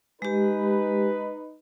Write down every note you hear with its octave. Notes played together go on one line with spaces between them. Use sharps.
G#3 D#4 G4 B4